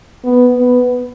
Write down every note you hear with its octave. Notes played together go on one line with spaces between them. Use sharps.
B3
B3